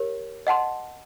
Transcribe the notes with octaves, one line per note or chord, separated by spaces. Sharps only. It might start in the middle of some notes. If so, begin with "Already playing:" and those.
Already playing: G4 A#4 C#5
D#5 F#5 A5 C6